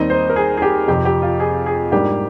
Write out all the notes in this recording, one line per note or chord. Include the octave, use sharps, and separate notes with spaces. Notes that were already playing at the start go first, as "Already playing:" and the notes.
Already playing: D#2 D#3 G3 C4 D#4 D#5
C5
A#4
G#4
G#4
G4
F2 C3 F3 G4
G4
F4
G#4
G#4
G#2 G3 A#3 D4 G4